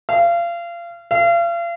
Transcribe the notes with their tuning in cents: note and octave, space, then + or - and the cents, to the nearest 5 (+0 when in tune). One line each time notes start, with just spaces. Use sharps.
F5 -30
F5 -40